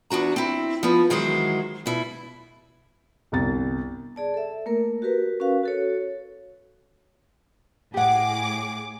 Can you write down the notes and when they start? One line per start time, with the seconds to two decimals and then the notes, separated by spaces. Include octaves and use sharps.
0.10 E2 D4 F#4 A#5
0.36 C4 E4
0.83 F3 B3
1.10 D#3 E3 F#3 G#3 G#4 C5
1.86 B2 E4
3.32 G1 C2 A6
4.16 G#4 D5 A5
4.34 A4 E5
4.66 A3 A#3 A#4
5.02 F#4 G4 A#4 B4
5.40 C#4 F#4 A#4 B4 F5
5.63 F#4 A4 C#5
7.94 A2 G4 G#4 F#5 D6